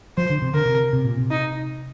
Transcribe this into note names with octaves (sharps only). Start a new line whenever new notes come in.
F3 C5
D3
C3
D3 A#4
C3
C3
A#2
C3
D#4